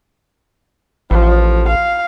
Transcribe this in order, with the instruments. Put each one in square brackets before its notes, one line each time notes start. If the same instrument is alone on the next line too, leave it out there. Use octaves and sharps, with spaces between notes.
[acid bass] A1 [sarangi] F3
[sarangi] F5